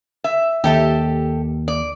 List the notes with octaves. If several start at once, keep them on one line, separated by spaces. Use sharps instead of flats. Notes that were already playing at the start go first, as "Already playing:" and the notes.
E5
D#2 G4 A4 E5
D5